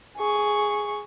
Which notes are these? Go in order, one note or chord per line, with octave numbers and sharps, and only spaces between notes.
G#4 C#6